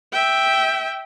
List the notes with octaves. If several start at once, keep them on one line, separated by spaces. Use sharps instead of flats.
E5 G5